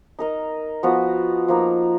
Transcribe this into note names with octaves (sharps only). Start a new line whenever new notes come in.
D#4 A#4 D#5
F3 B3 F#4 B4
F3 A#3 D#4